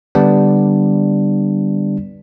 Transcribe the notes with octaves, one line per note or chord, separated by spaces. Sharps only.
D3 G3 B3 D4